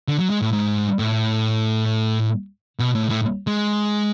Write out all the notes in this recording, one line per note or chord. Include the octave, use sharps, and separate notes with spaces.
D3
F#3
G#3
A2
G#2
A2
B2
A2
A2
G#3